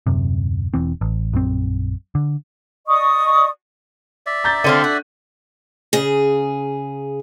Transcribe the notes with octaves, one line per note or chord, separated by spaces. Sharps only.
D#1 F#2 C3
E1 E3 C4
A1
A#1 F#2 C4
D3
D5 D#5 C#6 D#6
D5 E5
A#5 G6 A6
D3 C4 D4 F4 A4 D#7
F#4
C#3 G#4